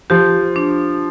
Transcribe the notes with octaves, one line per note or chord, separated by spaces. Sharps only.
F3 G4
D4